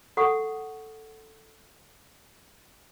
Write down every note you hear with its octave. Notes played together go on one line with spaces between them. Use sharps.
A4 F#5 C#6 D#6